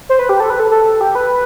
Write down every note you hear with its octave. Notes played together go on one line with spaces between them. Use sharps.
C5
B4
G4
A4
B4
A4
A4
G4
B4